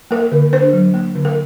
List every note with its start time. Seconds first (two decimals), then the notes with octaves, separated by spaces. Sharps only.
0.11 A#3 A#4
0.32 D3
0.53 D4 C5
0.73 F#3
0.94 A#3
1.15 D3
1.25 A#4